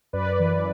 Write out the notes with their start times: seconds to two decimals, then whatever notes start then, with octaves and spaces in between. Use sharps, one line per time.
0.13 F#2 B4 D5
0.40 E3